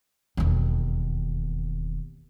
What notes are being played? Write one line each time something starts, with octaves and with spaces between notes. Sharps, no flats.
E1 D#2